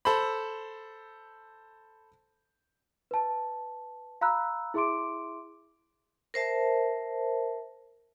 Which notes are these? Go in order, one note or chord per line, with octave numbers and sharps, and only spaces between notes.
A4 C5 B5
B4 A5
F5 A#5 B5 E6 F#6
E4 G#4 E5 C6 D6 D7
A#4 C5 E5 A5